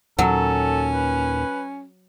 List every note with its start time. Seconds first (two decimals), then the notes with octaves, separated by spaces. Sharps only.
0.19 D#2 A#2 F#3 C#4 A4
0.94 B4